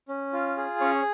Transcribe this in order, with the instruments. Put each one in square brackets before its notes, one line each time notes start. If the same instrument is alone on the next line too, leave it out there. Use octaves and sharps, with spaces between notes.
[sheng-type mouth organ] C#4
F4
G#4
C#4 C#5